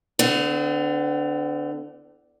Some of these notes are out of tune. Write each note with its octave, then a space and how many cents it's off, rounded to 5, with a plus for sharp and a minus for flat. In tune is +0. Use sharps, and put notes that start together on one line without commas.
D3 +0 C4 -45